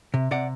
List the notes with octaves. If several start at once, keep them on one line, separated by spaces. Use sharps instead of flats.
C3
C3 D5 F#5